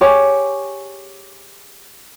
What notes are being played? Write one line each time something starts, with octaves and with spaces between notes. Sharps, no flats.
G4 G#4 C#5